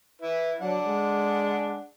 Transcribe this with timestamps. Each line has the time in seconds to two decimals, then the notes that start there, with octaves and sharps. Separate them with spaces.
0.22 E4 B4
0.60 F#3 D4 F#5
0.84 G#3